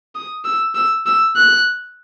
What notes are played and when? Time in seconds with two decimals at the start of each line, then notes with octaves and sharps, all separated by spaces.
0.15 D#6
0.44 E6
0.75 E6
1.06 E6
1.36 F#6